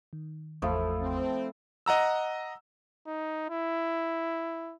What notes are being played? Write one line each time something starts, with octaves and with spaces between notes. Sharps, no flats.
D#3
G#1 E2 F3 A3 E4 F5
C4
D#5 F#5 A#5 E6
D#4
E4